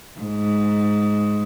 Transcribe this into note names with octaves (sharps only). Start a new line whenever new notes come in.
G#2